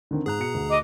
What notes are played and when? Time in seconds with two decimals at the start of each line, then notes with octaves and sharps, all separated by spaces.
0.11 D3 D#3 C4
0.26 G#2 G#4 A#5 F#6
0.39 B2 C#7
0.55 D2
0.68 D#5 D6